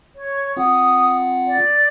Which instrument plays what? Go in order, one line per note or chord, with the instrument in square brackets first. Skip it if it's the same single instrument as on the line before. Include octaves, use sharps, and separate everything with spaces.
[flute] C#5
[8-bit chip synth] C4 F4 F#5 [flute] D#6
[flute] D5